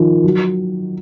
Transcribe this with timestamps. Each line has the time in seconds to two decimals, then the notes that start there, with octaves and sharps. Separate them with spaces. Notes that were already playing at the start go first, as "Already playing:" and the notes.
Already playing: D#3 F3
0.24 F#3